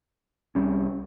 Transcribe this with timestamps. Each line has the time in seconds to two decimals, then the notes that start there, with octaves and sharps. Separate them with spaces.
0.55 C2 C3 G3 C#4